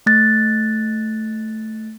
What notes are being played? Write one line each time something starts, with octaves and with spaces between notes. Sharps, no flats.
A3 F#6 A6